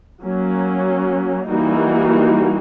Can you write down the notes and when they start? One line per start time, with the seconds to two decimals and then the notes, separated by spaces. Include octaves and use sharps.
0.23 F#3 A#3 C#4
1.47 E3 G3 A#3 D#4 F#4